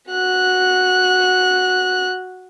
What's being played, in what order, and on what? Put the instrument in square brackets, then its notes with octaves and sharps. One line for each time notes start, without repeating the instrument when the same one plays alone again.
[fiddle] F#4 F#6